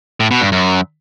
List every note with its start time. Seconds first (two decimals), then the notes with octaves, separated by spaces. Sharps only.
0.20 A2
0.31 B2
0.41 G2
0.52 F#2